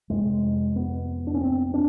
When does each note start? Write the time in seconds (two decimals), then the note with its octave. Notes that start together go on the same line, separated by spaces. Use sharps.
0.10 F2 C3 G#3
0.76 B3
1.27 D4
1.34 C#4
1.41 C4
1.74 D4